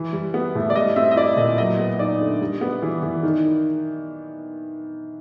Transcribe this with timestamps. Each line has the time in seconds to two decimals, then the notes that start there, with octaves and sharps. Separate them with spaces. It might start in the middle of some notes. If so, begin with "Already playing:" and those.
Already playing: E3
0.13 G3
0.34 B3
0.55 A2
0.70 D5
0.75 G3 D#5
0.96 C4 E5
1.11 D#5
1.16 E4 D5
1.37 A#2 D#5
1.58 F#3 D#5
1.78 B3
1.99 D#4 D5
2.21 D3
2.41 G3
2.61 B3
2.82 E3
3.03 E3
3.23 D#3